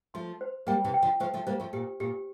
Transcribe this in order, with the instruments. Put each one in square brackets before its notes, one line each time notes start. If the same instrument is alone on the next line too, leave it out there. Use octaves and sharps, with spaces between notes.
[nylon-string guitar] F3 A3 [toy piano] C6
[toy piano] C5
[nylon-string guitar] G3 A#3 [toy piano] G5
[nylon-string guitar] C3 E3
[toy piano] G5
[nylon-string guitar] D3 F3
[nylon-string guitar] F3 A3 [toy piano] C5
[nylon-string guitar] F3 A3
[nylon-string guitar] G3 A#3 [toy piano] C5
[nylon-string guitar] F3 A3
[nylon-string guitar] A#2 [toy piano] G4
[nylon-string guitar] A#2 [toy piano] G4